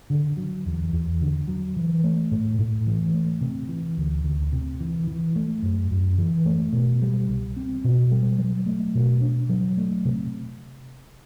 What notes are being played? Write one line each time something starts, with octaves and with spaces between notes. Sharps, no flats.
D3
F#3
E2
E2
D3
F#3
E3
A3
A2
A2
E3
A3
C3
E3
D2
D2
C3
E3
E3
A3
F#2
F#2
E3
A3
B2
G3
C2
C4
B2
G3
F#3
A3
B2
D4
F#3
A3
C3